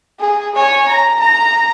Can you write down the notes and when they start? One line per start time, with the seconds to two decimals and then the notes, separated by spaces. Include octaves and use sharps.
0.20 G#4
0.55 C#5 G#5
0.88 A#5
1.20 A#5